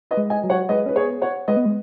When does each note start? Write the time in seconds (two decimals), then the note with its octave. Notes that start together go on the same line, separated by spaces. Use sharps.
0.11 B4 D#5
0.17 G#3
0.30 D#5 G#5
0.44 F#3
0.50 C#5 F#5
0.69 G#3 B4 D#5
0.86 C#4 B4
0.96 B3 G#4 C#5
1.21 C#5 F#5
1.48 G#3 B4 D#5
1.57 B3
1.65 G#3